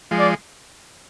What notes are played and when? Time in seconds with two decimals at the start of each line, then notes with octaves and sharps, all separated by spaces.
0.11 F3 G#3
0.19 D5